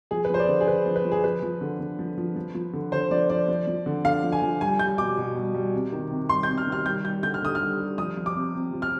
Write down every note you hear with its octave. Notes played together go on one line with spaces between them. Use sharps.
F3 G#4
B4
F3 C5
D5
D3
G#4
D3 B4
F3
B4
F3
G#4
F3 B4
F3
D3
D3
F3
F3
F3
F3
D3
D3 C5
F3 D5
F3 D5
F3
F3
D3
D3 F5
F3
G#5
F3
G3 G#5
G3 G6
B2 D6
B2
G3
G3
C3
D#3
C3
G3 C6
C3 G6
F6
D#3
F6
G3 G6
G3 G6
D3 G6
F6
D3 D#6
F6
G3
G3
F3 D#6
F3
D6
C3
C3
F3
F6